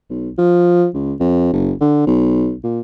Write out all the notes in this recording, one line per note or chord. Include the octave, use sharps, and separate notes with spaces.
B1
F3
C#2
F2
F#1
D3
B1
A#2